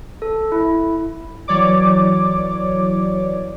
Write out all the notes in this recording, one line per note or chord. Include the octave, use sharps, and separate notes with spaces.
A4
E4
E3 F#3 C#5 D5 D6